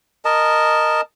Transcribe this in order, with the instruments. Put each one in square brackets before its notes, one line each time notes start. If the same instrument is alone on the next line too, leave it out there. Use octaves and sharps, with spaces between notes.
[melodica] A#4 D#5 A5